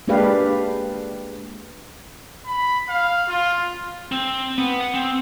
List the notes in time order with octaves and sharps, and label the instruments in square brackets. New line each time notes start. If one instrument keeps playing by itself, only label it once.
[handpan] G#3 A#3 D4 G4 B4 F5
[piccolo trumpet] B5
F5
F4
[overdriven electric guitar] C4
B3
F#5
C4